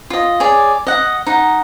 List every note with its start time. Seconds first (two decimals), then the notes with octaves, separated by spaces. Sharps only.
0.10 F4 D#5
0.40 G#4 C#5 D5
0.87 D#5 F#5
1.26 D#4 F#5